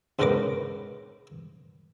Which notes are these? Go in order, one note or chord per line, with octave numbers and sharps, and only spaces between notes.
C#2 G#2 C#4 A#4 B4 D6